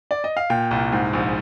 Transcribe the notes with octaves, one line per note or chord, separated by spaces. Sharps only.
D5
D#5
F5
A#2 G5
C2
G#2
A#1